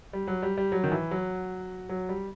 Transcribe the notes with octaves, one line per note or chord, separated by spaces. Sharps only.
G3
F#3
G3
G3
F#3
D#3
E3
F#3
F#3
G3